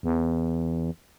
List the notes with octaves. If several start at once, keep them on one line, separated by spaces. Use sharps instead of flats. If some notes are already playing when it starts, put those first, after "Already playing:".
E2